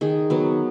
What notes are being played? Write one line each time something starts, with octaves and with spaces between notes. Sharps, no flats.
D#3 G#4
F#3 B3